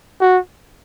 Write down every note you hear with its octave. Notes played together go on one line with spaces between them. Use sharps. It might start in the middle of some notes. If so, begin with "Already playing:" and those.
F#4